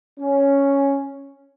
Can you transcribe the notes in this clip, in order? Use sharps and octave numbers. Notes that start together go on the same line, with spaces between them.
C#4